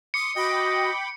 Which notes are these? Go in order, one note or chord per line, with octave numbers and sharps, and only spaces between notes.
C6 D6 D#6 C#7
F#4 D#5 G5 B5 D6